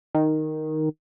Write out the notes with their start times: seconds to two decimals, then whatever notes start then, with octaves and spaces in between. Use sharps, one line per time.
0.15 D#3